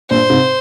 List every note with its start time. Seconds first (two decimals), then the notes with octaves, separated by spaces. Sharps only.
0.10 G2 A#2 C5
0.30 G#2 C3